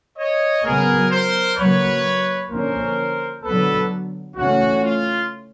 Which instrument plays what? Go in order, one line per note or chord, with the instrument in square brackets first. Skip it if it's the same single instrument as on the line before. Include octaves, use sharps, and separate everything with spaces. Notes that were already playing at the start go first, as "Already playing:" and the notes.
[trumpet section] C#5 D#5
[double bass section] C#3 F#3 B3 [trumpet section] G#4 A#4
[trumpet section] A#4 C5
[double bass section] C#3 F#3 A#3 [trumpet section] B4 C#5
[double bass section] D3 F3 A#3 C#4 [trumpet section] A#4 C5
[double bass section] D3 F#3 B3 [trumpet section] A4 B4
[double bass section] C#3 E3 A3 C#4 [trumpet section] F#4
[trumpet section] F4